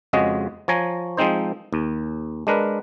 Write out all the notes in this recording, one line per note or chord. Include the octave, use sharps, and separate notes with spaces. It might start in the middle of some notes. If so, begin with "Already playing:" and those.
F2 C#3 G#3 F#4 D#5
F3 C#5 G#5 A#5
F3 G#3 C4 D#4 C5
D#2
G#3 D4 A#4 B4